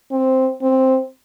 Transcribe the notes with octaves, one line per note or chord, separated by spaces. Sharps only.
C4
C4